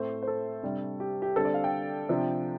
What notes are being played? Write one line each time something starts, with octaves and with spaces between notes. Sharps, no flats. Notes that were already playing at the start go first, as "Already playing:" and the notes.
Already playing: A2 A3 C4 C5
C5
A4
C3 G3 D4
G4
G4
D3 G3 C4 A4
D5
F5
G5
C3 F3 D4